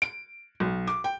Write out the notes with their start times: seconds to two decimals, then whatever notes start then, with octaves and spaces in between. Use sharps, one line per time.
0.02 D7
0.60 B1
0.87 D6
1.04 G5